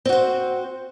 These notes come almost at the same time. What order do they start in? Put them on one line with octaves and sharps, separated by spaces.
C4 F#4 C5